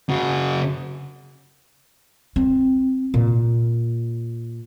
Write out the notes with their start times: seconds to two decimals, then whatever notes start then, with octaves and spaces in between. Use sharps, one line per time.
0.09 C#3 F#4
2.36 C4
3.14 A#2